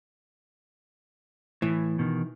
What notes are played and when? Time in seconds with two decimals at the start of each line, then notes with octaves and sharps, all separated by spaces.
1.62 A2 E3
1.99 B2 D#3